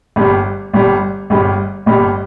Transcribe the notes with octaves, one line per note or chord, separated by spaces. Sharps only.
G1 G2 G3
G1 G2 G3
G1 G2 G3
G1 G2 G3